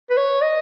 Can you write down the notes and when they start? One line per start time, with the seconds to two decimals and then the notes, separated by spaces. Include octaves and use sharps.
0.10 B4
0.17 C#5
0.41 D#5